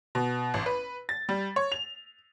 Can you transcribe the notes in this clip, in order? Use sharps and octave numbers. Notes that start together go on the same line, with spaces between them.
B2
A1
B4
A6
G3
C#5
F7